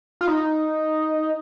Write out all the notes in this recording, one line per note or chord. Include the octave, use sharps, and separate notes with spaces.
F4
D#4